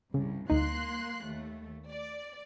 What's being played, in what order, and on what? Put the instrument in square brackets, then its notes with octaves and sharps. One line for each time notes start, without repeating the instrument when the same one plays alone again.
[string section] C2 G2 [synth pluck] C#3
[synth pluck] D2 D#4 [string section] A#3 C6 F#6
[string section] D#2 A3
D5